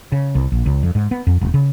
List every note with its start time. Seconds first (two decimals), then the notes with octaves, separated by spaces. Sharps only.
0.12 C#3
0.35 C2
0.52 A#1
0.66 C#2
0.83 F2
0.95 G#2
1.11 B3
1.27 F2
1.41 E1
1.54 C#3